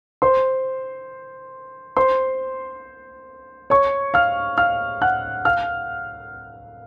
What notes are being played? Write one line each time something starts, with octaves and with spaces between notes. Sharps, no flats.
C5 C6
C5 C6
C#5 C#6
F5 F6
F5 F6
F#5 F#6
F5 F6